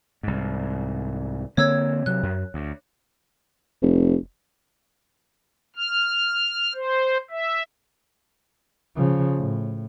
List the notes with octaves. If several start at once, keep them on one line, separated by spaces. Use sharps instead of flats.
C2 G#2
D3 A#3 C4 C#5 E6 G#6
C3 F#3 F#6
F#2
D2
F1
F6
C5
E5
C#3 F3
A2